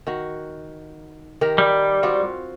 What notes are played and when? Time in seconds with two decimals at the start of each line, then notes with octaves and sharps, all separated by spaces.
0.07 D#3 F#4
1.41 D#3 G4 A#4
1.58 G3
2.03 C4 F4 F#4